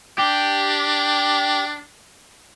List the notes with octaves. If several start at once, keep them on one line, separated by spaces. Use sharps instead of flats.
D4 G4